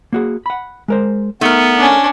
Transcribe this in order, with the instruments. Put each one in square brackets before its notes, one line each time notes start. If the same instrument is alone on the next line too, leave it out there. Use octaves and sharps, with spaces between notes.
[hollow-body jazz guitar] A#3 F#4 G#4
F#5 B5
G#3 A#4 C5
[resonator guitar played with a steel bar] A3 A#4 [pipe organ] B3 [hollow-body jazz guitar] D#4
[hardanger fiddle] C#4 D4